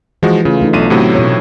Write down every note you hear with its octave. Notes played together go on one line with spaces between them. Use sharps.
E3 F3 G#3 F#4
C#3 A3 F4
A3 D4 D#4
B1 B3 D#7
A2 C3 F#3
B2 C#5